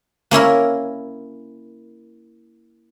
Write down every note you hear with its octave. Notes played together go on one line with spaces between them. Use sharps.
A#3 C#4 E4 A#4